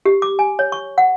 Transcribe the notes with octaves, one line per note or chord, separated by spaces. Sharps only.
G4
D6
G#5
C#5
C#6
F#5